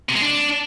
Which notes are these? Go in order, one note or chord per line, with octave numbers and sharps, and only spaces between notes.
C3
G#3
D4